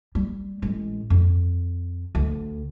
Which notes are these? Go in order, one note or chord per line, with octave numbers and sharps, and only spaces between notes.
G3
A1 G#3
F2
D2